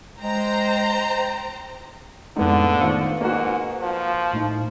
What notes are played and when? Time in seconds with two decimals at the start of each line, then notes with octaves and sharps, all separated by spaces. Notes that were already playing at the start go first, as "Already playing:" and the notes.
0.21 G#3 C5 G5 A#5
2.36 F2 A2 D3 G#3 B3 D#4
2.81 D#3 B3 F4 B4 C5 C#7
3.21 G#2 A#3 F#4
3.81 F3
4.33 A2 A3 D#4